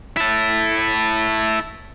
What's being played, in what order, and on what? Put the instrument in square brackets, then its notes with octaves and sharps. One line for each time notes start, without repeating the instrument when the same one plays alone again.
[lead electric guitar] E4 A4